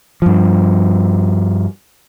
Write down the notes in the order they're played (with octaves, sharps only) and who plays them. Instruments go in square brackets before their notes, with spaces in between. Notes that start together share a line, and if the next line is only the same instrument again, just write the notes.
[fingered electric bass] G2 F3